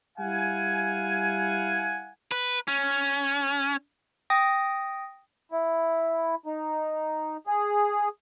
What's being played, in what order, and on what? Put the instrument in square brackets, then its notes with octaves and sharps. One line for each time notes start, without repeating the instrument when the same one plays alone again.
[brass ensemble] G3 E4 F5 F#5 G#5
[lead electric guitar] B4
C#4
[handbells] G5 D#6 A#6
[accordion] E4
D#4
G#4